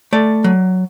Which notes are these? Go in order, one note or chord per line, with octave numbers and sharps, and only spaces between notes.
A3 D5
F#3